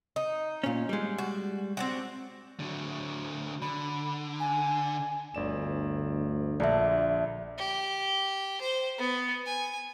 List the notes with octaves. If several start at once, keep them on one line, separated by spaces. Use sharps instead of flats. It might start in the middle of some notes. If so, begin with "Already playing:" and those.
D#4
A#2 C#4
G3 G#3
F#4
C4 D4 F#4
D3 F#3
D3 B5
G#5
G1 D2 D5 E7
A#1 D3 D5 E5 A5
G4
C5
B3
G#5